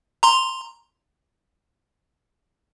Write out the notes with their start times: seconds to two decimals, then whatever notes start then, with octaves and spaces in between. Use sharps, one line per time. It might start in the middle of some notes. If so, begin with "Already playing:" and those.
0.23 A#5 C6